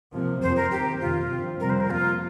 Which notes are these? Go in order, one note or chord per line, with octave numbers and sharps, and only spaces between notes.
C3 F3 A#3
F2 F3 C4 C5
A#4
G2 D#3 C4 G4
F2 C3 D#3 A#3 F4
G2 F3 C4
F2 C3 G3 C4 A#4
C5
A#4
F2 F3 A#3 F4